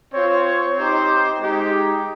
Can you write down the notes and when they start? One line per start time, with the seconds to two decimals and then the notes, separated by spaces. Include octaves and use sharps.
0.13 C4 F4 C#5
0.76 C4 D#4 G4 C5
1.40 G#3 D#4 G4